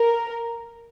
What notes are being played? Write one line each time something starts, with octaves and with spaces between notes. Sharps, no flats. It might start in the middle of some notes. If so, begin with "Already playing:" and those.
Already playing: A#4